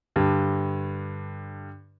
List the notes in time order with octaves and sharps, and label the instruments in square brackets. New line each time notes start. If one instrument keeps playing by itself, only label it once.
[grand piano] G2 D3